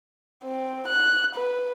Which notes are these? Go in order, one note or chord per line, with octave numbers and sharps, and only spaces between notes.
C4
F#6
B4